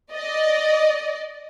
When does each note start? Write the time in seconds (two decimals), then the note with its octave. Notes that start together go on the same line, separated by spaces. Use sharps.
0.13 D5 D#5